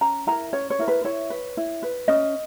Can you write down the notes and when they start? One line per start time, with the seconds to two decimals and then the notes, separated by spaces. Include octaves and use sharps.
0.01 C#4 A#5
0.27 E4 A#4 A#5
0.53 C#4 C#5
0.70 C#5
0.79 E4 A#4
0.88 B4
1.05 E4 C#5
1.30 B4
1.57 E4
1.83 B4
2.08 C#4 D#5